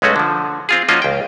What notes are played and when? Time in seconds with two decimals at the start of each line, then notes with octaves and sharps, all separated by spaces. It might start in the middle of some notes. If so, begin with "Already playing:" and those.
0.02 B1 G#3 A3 C#4 F#4
0.16 D3 F3
0.69 C4 F4 G#4
0.89 F3 A#3 C#4 F4 F#4 D#5
1.02 C#2 G5